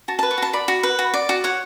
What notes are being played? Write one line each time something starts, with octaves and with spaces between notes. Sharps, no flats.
F#4 A5
A5
B4
C#6
F#4 A5
D5 B5
F#4
B4
F#4
D5
F#4
C#5 F#5